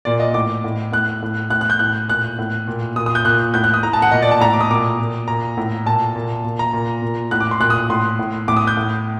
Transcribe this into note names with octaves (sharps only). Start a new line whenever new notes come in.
A#2 D5
D#5
A2 D6
A2
A2 F#6
A2
A2 F#6
F#6
G6
A2 F#6
A#2 F#6
A2
A#2
A#2 D#6
D#6
G6
A#2 F#6
A2 G6
F#6
D#6
A2 A#5
A5
F#5
A#2 D#5
D5
A5
A2 A#5
D6
D#6
A#2 D6
A#2
A#2 A#5
A2
A#2 A5
A#2
A#2
A#5
A#2
A#2
A2 F#6
D6
C6
A#2 F#6
D#6
A2 C6
A2
A2 D6
D#6
G6
A2